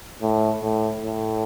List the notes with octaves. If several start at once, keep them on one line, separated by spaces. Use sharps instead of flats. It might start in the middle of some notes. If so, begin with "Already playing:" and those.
A2
A2
A2